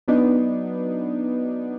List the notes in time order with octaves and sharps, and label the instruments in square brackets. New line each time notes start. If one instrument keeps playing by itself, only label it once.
[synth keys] F#3 B3 D4 D#4